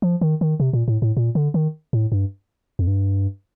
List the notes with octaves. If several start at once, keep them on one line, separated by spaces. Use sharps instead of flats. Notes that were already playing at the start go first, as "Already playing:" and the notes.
F3
D#3
D#3
C3
A#2
A2
A2
A#2
D3
D#3
A2
G2
F2
G2